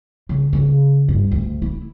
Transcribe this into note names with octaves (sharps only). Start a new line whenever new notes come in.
C#3
C#3
G2
D2
E4